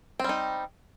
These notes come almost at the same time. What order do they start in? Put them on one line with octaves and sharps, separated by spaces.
C4 G3 D#4